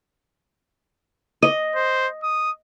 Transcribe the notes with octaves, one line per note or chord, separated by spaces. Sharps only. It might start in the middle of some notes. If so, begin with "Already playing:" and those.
D#5
C5
D#6